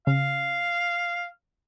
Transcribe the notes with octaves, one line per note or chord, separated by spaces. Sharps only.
C#3 F5